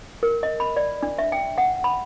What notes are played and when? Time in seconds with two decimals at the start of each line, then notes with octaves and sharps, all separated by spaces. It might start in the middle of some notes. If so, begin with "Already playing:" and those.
0.23 A#4
0.43 D#5
0.60 B5
0.77 D5
1.03 D4
1.18 E5
1.32 G5
1.58 F#5
1.84 B5